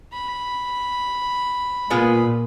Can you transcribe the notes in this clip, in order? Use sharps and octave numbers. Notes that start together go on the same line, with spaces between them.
B5
A#2 G#3 B3 F4